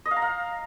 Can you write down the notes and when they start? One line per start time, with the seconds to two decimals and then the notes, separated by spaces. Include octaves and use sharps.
0.06 D#5
0.11 F5
0.16 A#5
0.22 F5